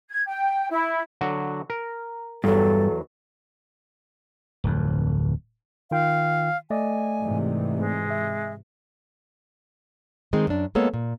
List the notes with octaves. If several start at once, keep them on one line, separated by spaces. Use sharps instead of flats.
G#6
G5
E4
D3 F#3 F#4
A#4
E2 G2 F#3 A4
D1 F2
D#3 F4 F5 G5
A3 D5 D#5 G#5
G#2 C3 E3
G#3
E5
D#3 G#3 C4
F#2 D4
G#3 A#3 B3 A4 C#5
A#2